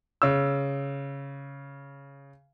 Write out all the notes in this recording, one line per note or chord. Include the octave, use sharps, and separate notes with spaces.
C#3 E6